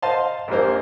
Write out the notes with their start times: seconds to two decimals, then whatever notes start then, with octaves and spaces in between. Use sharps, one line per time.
0.02 C5 D#5 F5 A5 C6
0.48 A#1 F2 C3 A#3 C5